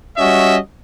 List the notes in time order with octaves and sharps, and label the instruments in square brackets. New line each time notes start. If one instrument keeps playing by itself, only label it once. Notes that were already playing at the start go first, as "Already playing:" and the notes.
[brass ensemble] G3 C#4 F#4 D#5 E5